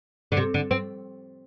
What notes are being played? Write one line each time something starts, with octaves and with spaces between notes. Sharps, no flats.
D3
C3
D3
C4